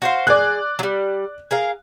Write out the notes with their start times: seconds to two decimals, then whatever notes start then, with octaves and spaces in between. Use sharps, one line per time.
0.02 F#4 C5 F5
0.27 G#3 D5 G#5 F#6
0.79 F#3 G3
1.51 G#4 A#4 F5